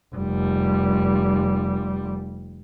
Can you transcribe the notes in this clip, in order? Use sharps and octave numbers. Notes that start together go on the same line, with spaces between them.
F1 G3